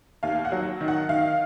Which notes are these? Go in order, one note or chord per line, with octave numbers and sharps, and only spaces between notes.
D#2 F5
F#5
F#3
D#3
F#5
D#3 F5